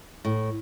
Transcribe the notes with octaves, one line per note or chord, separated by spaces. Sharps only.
A2